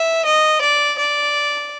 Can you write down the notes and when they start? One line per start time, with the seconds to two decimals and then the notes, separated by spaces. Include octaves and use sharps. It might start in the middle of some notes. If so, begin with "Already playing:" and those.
Already playing: E5
0.26 D#5
0.62 D5
0.99 D5